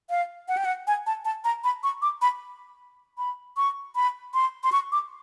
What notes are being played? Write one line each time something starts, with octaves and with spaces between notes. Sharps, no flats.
F5
F#5
G5
F#5
G#5
A5
A5
A#5
B5
C#6
D6
B5
B5
C#6
B5
C6
C6
C#6
D6